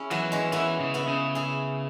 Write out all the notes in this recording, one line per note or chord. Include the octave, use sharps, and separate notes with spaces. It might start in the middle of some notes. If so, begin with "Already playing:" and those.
Already playing: C#4 E4 G#4
E3 F#3 B3
G#3 C#4
E3 B3 E4
C#3
B3 E4
C#3
E4 G#4